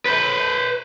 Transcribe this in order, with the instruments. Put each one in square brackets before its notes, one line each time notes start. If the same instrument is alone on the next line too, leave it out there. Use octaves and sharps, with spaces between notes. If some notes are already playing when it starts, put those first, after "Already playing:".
[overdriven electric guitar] B4 C5